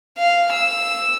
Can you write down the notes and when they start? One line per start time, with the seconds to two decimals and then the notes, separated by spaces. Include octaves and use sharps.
0.18 F5
0.53 E6